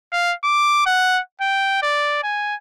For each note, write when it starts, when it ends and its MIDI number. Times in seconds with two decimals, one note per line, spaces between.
0.12 0.33 77
0.44 0.83 86
0.86 1.20 78
1.41 1.79 79
1.82 2.19 74
2.23 2.55 80